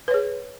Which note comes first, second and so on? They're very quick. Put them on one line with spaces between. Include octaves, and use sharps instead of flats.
B4 C#5 G#4